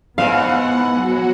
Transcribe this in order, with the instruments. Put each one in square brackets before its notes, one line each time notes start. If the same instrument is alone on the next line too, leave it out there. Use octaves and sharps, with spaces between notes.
[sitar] G#2 E3 [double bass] B3 [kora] F5 [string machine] F#5
[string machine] F#3 F#4